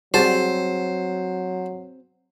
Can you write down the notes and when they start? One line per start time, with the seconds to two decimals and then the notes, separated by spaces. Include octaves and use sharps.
0.14 F#3 G3 C4 F#4 G#4 C5 A5